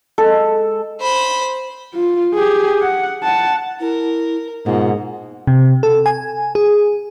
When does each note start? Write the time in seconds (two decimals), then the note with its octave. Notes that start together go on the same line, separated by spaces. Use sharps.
0.18 G#3 A4
1.01 C5 B5
1.94 F4
2.35 G4 G#4
2.81 F#5
3.23 F#5 A5
3.80 E4 A#4
4.66 G#2 B2 A#3 F4
5.47 C3
5.83 A4
6.06 G#5
6.55 G#4